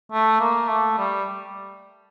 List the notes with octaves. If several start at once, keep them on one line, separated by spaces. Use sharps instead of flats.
A3
A#3
A3
G3